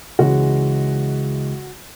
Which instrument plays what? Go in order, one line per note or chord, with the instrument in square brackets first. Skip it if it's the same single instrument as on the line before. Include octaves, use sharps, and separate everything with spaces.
[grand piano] C#2 C#3 E3 G#3 F#4